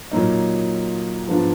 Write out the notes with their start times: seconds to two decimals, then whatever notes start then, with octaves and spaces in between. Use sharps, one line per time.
0.11 A#2 F#3 A#3 D#4
1.27 G#2 F3 B3 D4 F4